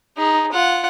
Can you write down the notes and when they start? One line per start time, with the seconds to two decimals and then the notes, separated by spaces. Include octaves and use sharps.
0.17 D#4 G#4
0.51 F4 F#5